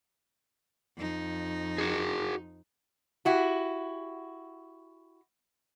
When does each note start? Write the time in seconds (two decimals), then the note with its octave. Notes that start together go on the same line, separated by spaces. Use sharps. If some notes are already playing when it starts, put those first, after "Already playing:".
0.97 F2 D#4
1.78 F#4 G#4
3.25 E4 F#4 G4